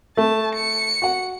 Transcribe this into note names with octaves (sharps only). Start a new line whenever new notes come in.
A3 A5
C#7
F#4 F#5